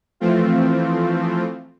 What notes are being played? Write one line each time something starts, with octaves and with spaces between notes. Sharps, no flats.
E3 F3 A3 C4 F4